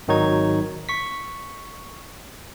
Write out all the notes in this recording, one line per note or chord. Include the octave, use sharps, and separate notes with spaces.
G#1 D#3 F#3 D#4 C#5 G#6
C#6 B6